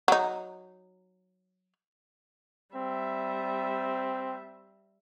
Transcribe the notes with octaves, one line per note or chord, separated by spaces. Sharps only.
F#3 D#4
G3 C4 E5